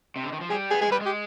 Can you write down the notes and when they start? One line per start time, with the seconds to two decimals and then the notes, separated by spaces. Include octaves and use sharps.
0.16 C3
0.23 D3
0.33 D#3
0.41 F3
0.50 G3 G#4
0.71 B3 G#4
0.81 G#3 G#4
0.91 G3 B4
1.01 G#3 G4